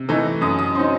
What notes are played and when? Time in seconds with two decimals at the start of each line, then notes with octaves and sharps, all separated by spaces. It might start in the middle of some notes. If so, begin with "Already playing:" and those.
Already playing: C3
0.09 E3 A3 D#4
0.41 F#2 D#6
0.59 D#6
0.74 F#3 C4 D#4 C6